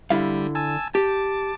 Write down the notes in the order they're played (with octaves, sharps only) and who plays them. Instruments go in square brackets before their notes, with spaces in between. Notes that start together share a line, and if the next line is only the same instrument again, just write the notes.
[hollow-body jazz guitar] D3 E4 F5 [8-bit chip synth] G3
[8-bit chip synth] G#5 A5 E6
[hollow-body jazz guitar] G4 [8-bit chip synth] A5 D6